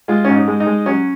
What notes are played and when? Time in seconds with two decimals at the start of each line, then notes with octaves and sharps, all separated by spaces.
0.08 G#3 F4
0.24 G#2 C#4
0.35 D#4
0.47 G#3
0.60 D#4
0.67 G#3
0.86 F#3 C#4